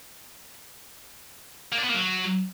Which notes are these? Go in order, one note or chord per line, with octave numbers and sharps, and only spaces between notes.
A#3
D4
B3
A#3
F#3